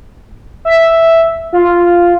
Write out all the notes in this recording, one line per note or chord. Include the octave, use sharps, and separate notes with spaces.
E5
F4